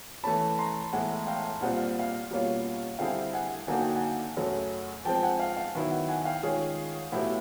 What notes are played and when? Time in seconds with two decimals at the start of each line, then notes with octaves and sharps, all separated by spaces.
0.24 E3 A3 C#4 A5 B5
0.59 A#5 C6
0.93 A2 E3 G#3 B3 E4 F#5 G#5
1.27 F5 G5
1.61 A#2 G3 C4 F4 G#4 F#5
1.74 F5
1.99 F5
2.31 B2 G3 A#3 C#4 F4
2.99 D3 G3 C4 E4 G#4 F5 G5
3.33 F#5 G#5
3.67 D3 F#3 A#3 D#4 F#4 G#5
3.81 G5
3.96 F#5 G#5
4.37 F#2 C#3 F#3 A3 C#4
5.05 F3 G#3 C4 G5 A5
5.15 G5
5.23 F#5 G#5
5.39 F5 G5
5.57 F5
5.75 D#3 F#3 B3 E4
5.91 F#5
6.08 F#5 G#5
6.25 F5 G5
6.42 D#3 G#3 C#4 F4 G#4
7.12 A2 F#3 B3 E4 G4